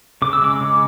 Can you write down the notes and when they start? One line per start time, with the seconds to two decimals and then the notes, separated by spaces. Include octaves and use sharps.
0.22 C#3 D6
0.33 E6
0.41 G#3 D6
0.61 C#3